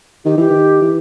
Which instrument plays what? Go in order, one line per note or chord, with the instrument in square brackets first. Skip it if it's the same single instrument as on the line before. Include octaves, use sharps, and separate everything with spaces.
[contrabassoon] D#3 [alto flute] G4
[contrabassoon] E3 [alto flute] G4
[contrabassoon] D#3
E3